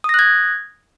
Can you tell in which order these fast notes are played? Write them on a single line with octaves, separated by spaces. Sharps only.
D#6 A#6 F#6 G#6